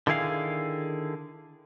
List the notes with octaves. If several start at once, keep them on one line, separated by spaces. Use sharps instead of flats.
D3 D#3 E4 G#4 F5